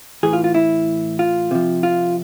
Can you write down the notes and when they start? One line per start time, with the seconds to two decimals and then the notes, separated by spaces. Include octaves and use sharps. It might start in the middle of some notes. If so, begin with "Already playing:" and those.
0.23 A2 E3 G#4
0.33 F4
0.44 F4
0.55 E4
1.19 F4
1.51 C3 F3
1.83 F4